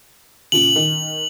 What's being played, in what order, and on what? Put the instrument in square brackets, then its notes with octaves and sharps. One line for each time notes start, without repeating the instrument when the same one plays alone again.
[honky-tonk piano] A#2 C#3 [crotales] F#7
[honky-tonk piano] D#3